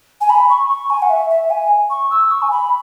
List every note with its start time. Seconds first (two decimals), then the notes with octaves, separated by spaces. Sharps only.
0.21 G#5
0.30 B5
0.50 C#6
0.69 C#6
0.90 G#5
1.02 F#5
1.10 E5
1.30 E5
1.50 G#5
1.90 C#6
2.11 E6
2.31 C#6
2.42 G#5
2.51 B5